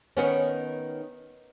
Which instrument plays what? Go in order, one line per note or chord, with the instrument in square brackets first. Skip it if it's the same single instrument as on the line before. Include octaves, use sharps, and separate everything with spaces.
[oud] D#3 B3 C#4